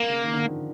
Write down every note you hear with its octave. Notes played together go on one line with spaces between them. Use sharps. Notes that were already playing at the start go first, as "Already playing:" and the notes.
Already playing: A#3
C#3
D#3
D3
D#3
F3